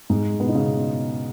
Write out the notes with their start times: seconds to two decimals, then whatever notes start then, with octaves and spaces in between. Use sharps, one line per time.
0.10 G#2 G#3
0.40 B2 B3
0.49 D#4
0.55 C#3 C#4